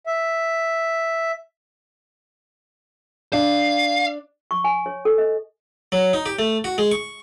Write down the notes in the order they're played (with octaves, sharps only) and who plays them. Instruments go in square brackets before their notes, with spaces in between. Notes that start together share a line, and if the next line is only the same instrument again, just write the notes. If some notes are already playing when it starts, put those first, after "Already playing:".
[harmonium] E5
[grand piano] D4 [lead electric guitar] F5
[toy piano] C#6
G#5
C#5
A4
D#5
[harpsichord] F#3
D#4
G4
A3
F#4
G#3
C#6